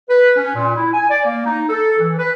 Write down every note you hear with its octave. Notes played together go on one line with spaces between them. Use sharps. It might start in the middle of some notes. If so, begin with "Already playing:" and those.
B4
C#4
A#2
E4
G#5
D5
A#3
D#4
A4
E3
B4